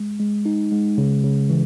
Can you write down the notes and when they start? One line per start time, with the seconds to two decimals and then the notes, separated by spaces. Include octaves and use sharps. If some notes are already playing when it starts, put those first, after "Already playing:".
Already playing: G#3
0.20 G#3
0.45 D#4
0.72 G#3
0.98 C#3
1.24 C#3
1.50 E3